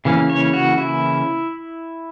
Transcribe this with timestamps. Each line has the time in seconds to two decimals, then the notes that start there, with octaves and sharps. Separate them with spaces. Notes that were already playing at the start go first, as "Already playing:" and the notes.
0.05 C#3 E3 A#3 C#4
0.30 C#5
0.54 F#4
0.78 E4